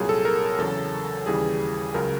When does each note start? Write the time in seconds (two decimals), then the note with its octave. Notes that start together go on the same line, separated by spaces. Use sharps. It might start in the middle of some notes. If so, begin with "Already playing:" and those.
Already playing: C2 A#2 F#3 G#4
0.09 A4
0.25 A#4
0.58 E2 C#3 F#3 A4
1.26 D#2 C#3 E3 G3 G#4
1.94 C#2 C#3 F#3 A#4